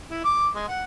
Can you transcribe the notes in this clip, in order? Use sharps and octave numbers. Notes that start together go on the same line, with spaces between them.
E4
D6
G#3
F#5